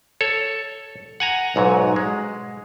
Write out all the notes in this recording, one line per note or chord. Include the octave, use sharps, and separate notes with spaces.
A4 C#5
F#5 G#5 A#5
B1 G#2 F#3
G#3